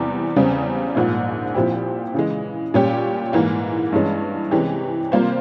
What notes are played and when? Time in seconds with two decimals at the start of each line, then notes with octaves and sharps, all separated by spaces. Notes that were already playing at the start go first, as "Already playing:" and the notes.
Already playing: E2 C3 E3 G3
0.36 E2 C#3 G3 C4
0.95 A#1 G#2 F3 A#3
1.54 A#2 F3 C4 E4 G4
2.14 C#3 E3 G#3
2.74 A#2 G3 C#4 G4
3.33 G#2 E3 A#3
3.92 G2 E3 G#3 C#4
4.51 C3 E3 G#3 C#4 G4
5.12 C3 G3 A#3 F4 C5